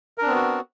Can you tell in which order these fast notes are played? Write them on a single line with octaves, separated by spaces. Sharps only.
A#4 D4 C4 B3 F#4